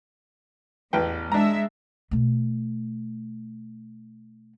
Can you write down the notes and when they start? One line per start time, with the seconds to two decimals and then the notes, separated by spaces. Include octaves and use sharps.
0.93 A1 E2 B4 G5
1.32 G#3 D4 E5 A#5
2.11 B2 A3